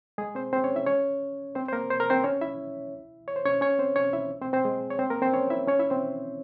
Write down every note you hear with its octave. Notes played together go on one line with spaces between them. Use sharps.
G#3 G#4
C4 C5
C4 C5
C#4 C#5
E4 E5
C#4 C#5
C4 C5
C5
A#3 A#4
C5
A#4
C4 C5
C#4 C#5
E4 E5
C#5
C5
C#4 C#5
C#4 C#5
C4 C5
C#4 C#5
E4 E5
C4 C5
C4 C5
G#3 G#4
C#5
C4 C5
A#3 A#4
C4 C5
C#4 C#5
E4 E5
C#4 C#5
E4 E5
C4 C5